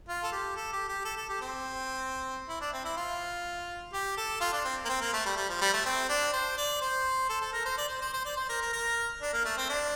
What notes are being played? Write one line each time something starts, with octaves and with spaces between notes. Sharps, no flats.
F4
A4
G4
A4
G4
G4
A4
A4
G4
C4
E4
D4
C4
E4
F4
G4
A4
F4
D4
C4
A#3
C4
A#3
A3
G3
G3
F3
G3
A3
C4
D4
C5
D5
C5
A4
A4
A#4
C5
D5
C5
C5
C5
D5
C5
A#4
A#4
A#4
D4
A#3
A3
C4
D4